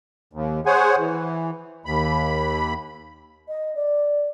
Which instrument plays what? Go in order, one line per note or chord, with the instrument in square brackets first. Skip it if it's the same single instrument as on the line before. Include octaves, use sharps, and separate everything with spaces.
[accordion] D#2
G#4 C5 C#5 F#5 G#5
E3
D#2 B5
[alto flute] D#5
D5